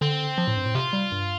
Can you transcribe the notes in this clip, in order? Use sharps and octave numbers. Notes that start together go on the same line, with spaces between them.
D3 C4
F3
A2
G2
A2
C3 F4
G3
G2